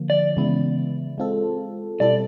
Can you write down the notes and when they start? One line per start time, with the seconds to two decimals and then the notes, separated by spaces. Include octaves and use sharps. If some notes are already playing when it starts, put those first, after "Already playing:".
Already playing: D3 F3 A#3
0.10 D5
0.37 C#3 E3 G#3 B3 E4
1.18 G#3 C4 F4 A4
2.00 B2 G3 C4 E4 A4 D5